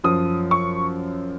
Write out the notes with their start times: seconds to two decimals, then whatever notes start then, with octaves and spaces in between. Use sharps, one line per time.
0.04 F#2 F3 D#6
0.51 C#6